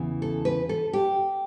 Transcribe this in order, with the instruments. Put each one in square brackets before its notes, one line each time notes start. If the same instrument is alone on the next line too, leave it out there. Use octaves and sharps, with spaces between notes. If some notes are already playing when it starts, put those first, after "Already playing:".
Already playing: [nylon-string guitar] E2 C#3 E3
A4
B4
A4
G4